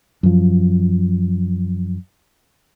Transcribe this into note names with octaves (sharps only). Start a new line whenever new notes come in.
F#2 F3